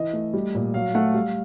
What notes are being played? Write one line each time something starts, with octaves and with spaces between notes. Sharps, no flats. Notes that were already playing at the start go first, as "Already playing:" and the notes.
Already playing: E3 D#5
A3
G3
A#2
F#3 F5
A3 F#5
G3 F5